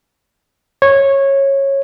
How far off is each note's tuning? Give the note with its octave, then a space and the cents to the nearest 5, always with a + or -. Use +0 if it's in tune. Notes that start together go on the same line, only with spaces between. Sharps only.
C#5 -15